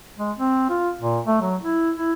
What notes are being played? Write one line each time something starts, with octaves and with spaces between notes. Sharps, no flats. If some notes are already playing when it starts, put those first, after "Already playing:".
G#3
C4
F4
A#2
A3
F#3
E4
E4